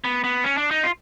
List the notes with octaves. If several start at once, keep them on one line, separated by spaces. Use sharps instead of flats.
B3
B3
C#4
D4
D#4
F4